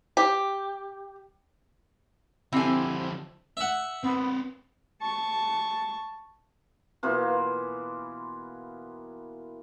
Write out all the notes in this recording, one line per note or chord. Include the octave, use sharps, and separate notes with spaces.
G4
D3 F3 C4 E4 G4 A4 G#5
E5 F#5
B3 C4 B4
A5 C#6
B2 E3 A#3 F4